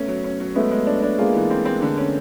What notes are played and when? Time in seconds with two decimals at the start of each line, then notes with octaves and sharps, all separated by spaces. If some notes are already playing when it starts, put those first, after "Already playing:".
Already playing: A3 B3 C#4
0.08 F#3
0.24 C#4
0.40 F#3
0.55 G#3 A3 B3
0.71 G#3
0.87 D4
1.02 D4
1.18 G#3 A#3 F4
1.35 E3
1.50 C4
1.65 C4
1.82 D3
1.97 C#4